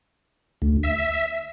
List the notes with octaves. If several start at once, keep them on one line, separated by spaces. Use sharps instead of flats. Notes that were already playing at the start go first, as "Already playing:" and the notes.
D2
E5